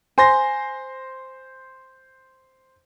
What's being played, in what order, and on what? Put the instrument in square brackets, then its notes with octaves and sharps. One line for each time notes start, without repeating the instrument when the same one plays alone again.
[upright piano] C5 C6 A#6 [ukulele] G#5